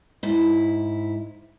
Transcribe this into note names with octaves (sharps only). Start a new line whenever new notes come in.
G#2 E4